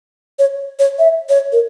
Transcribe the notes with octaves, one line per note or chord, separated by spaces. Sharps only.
C#5
C#5
E5
C#5
A#4